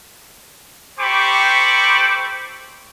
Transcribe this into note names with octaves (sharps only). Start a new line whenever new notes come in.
G4 A4 C5 B5 C#6 D6